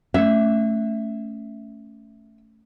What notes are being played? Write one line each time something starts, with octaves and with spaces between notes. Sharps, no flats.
A3 C#4 E5